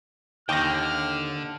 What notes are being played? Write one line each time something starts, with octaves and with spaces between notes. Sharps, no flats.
D#2 D3 G5 F6 A#6